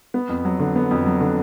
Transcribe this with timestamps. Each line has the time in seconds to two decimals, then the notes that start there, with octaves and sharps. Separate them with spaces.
0.14 B3
0.29 F2
0.45 F#3
0.60 D3
0.76 B3
0.91 F2
1.06 F#3
1.21 D3